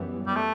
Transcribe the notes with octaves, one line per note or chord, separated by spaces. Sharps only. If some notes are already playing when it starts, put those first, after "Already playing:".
Already playing: F#2 E3 G3 B3
G3
A3